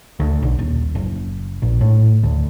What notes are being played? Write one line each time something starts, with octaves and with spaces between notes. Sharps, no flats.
D2
B1
D#1
F#1
A#1
A2
D2